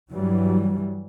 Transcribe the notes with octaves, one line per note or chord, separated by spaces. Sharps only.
G2 E3 F#3 G3